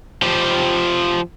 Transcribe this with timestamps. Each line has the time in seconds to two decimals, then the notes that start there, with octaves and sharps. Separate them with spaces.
0.22 F3 G4